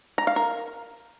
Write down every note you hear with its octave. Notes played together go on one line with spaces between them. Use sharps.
A#5
F5
A#4